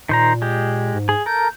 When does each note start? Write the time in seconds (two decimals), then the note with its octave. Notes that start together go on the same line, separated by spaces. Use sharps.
0.09 A#2 D#3 C5 A#5
0.42 G#3 G4
0.94 G#2
1.09 G#4
1.26 A4 A#4 G6